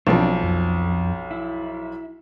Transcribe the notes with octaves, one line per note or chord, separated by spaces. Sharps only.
B1 F3 C4 D4
F2
E4